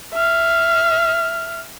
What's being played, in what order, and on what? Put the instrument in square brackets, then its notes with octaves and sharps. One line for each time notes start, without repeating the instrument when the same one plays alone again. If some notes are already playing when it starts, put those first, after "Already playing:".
[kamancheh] E5 F6